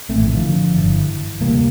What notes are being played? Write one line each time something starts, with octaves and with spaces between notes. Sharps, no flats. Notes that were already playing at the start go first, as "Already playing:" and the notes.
A#1 A3 C4
A2 E3
E3
D3 F3
G1 G2 D3 E3
E1 D2 C3 G3 A#3